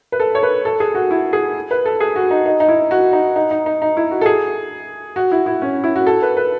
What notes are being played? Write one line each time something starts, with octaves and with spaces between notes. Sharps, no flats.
B4
A4
C#5
B4
A4
G#4
F#4
E4
G#4
B4
A4
G#4
F#4
D#4
D#4
D#4
E4
F#4
D#4
D#4
D#4
D#4
D#4
E4
F#4
A4
G#4
F#4
E4
E4
C#4
E4
F#4
A4
B4
B4